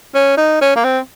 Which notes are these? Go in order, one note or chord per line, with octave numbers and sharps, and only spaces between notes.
C#4
D#4
C#4
A#3
C4